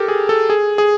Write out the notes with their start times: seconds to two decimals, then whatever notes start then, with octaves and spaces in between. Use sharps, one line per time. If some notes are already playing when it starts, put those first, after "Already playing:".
Already playing: G4 A4 A#4
0.08 G#4
0.29 A4
0.50 G#4
0.78 G#4